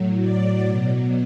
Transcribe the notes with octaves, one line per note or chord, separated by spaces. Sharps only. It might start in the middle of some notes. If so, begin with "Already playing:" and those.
Already playing: A2 F#3
D5
B2 F#3